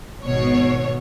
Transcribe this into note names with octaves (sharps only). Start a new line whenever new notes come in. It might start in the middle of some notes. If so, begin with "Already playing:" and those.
G#1 B2 C#5